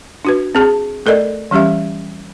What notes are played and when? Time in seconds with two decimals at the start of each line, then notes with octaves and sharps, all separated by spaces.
0.25 D4 F#4 B4
0.55 C4 G#4 A5
1.06 A3 A4 A#4 D5 D#5
1.51 E3 G3 C#4 G4 E5